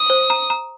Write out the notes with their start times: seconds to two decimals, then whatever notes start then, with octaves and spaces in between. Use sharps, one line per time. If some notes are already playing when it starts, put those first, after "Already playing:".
Already playing: D#6
0.10 C5
0.30 A#5
0.50 A#5